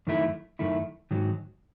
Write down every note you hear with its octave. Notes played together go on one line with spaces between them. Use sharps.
F#2 D#3 A3 E4
F#2 D#3 A3 E4
G#2 D#3 F#3